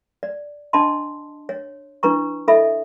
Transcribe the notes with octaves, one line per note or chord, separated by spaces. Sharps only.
D5
D4 D#5 A5 B5 C6
C#5
D4 E4 B4 A#5 C#6
E4 A4 D#5 E5 B5